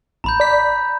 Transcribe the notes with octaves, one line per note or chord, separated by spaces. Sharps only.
A1 A#5 B5 G6
D5 B6